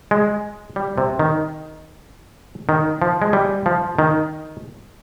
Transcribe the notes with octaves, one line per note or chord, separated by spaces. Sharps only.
G#3
G3
C3
D#3
D#3
F3
G#3
G3
F3
D#3